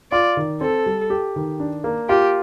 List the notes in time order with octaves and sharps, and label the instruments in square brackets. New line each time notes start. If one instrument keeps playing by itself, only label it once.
[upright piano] F4 [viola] D5
[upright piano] D#3
[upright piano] C4 [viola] A4
[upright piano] G3
G4
D#3
D4
A#3
[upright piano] F4 [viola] G4